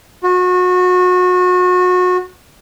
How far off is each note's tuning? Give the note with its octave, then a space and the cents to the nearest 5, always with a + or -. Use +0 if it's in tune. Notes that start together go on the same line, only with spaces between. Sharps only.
F#4 -30